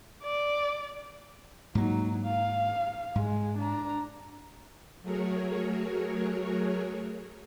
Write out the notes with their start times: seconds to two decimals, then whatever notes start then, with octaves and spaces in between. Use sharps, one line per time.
0.23 D5
1.75 G#2 F#3 A#3 D#4
2.26 F5
3.15 G#2 G#3
3.58 D4 A#5
5.02 F#3 A3 F#4 G#4 A#4 C#5